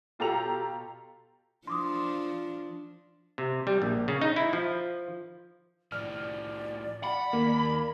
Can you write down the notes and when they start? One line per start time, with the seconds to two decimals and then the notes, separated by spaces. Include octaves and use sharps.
0.19 B2 F4 G4 A4 A#5 F7
1.67 F3 D4 C6 D6 D#6
3.38 C3
3.67 G3
3.82 A#1
4.08 C#3
4.21 D#4
4.36 E4
4.53 F3
5.92 A2 F3 D5 F6
7.04 F#5 B5
7.33 D#2 A#3